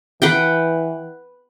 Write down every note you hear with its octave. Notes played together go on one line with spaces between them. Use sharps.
E3 B4 F#5 G5